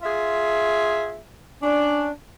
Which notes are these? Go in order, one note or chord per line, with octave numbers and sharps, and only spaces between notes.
F4 G#4 E5
C#4 D4